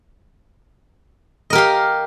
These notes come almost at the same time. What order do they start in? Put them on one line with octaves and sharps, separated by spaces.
D#5 A#4 G4 F5